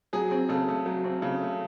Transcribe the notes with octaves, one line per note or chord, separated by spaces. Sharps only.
F#3 G#4
C4
C#3 A4
A3
F#3
C4
C#3
A3